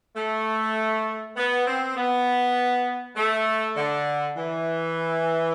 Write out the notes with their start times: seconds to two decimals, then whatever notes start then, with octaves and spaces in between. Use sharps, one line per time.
0.16 A3
1.37 B3
1.67 C4
1.96 B3
3.16 A3
3.76 D3
4.37 E3